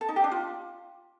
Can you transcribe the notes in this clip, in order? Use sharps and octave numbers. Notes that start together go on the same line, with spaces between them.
A4
D#4
G4
D4
F4